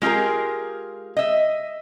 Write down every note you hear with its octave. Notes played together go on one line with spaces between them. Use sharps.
G#3 F4 G4 G#4 A#4
D#5 E5